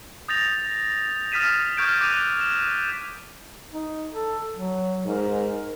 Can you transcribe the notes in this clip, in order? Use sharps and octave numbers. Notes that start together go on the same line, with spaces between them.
D#6 G6 A6 A#6 F7
D#6 F6 A6 B6 D#7 E7
C#6 D#6 F6 G6 G#6 D7
D6 F#6 G6 D#7 F7
E7
D#4
A4
F#3
G#2 A#4